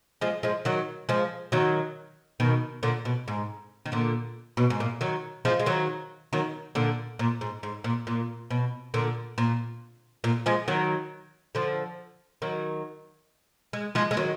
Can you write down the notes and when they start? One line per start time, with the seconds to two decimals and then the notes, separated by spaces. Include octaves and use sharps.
0.21 F3 G#3
0.43 F3 G#3
0.65 D#3 F#3
1.09 F3 G#3
1.52 D#3 F#3
2.40 B2 D#3
2.83 A#2 D3
3.05 B2
3.28 G#2
3.86 D#3
3.92 A#2 D3
4.57 B2
4.70 G#2
4.80 A#2
5.01 D#3 F#3
5.45 F3 G#3
5.59 G#3
5.66 D#3 F#3
6.33 D#3 F#3
6.75 A#2 D3
7.19 A#2
7.41 G#2
7.63 G#2
7.84 A#2
8.07 A#2
8.51 B2
8.94 A#2 D3
9.38 A#2
10.24 A#2
10.46 F3 G#3
10.68 D#3 F#3
11.55 D3 F3
12.42 D#3 F#3
13.73 G#3
13.95 F3 G#3
14.11 G#3
14.17 D#3 F#3